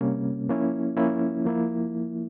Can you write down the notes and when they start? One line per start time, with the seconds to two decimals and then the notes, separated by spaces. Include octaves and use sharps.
0.01 C3 G3 A#3 C#4
0.49 F3 A#3 C#4 E4
0.97 F3 A#3 C#4 E4
1.45 F3 A#3 E4